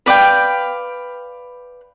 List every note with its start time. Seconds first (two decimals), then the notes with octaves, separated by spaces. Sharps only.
0.06 B4 D5 F5 G5